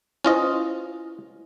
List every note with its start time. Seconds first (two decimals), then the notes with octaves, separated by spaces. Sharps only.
0.25 C#4 E4 F4 B4 C5 D#5